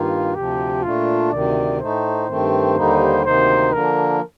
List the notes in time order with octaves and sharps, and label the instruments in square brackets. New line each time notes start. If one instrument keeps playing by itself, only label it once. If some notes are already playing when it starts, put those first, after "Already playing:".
Already playing: [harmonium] G2 D#3 A#3 [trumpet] F4
[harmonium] D2 C3 F3 [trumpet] G4
[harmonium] A#2 A3 D4 [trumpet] F4
[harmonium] D2 C3 D#3 [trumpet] D5
[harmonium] A2 A3 D#4 [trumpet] C5
[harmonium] G2 D#3 A3 C4
D#2 D3 G3 A#3 D#4
[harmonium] D2 C3 D#3 A#3 D#4 [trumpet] C5
[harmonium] D3 F3 A#3 D4 [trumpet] A#4